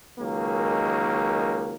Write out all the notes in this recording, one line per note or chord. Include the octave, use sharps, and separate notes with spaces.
C#2 D#3 F#3 G#3 A#3